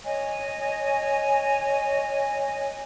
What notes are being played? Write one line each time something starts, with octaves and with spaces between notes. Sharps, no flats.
C#5 D#5 G#5